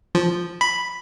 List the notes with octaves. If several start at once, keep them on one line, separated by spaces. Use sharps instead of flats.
F3
B5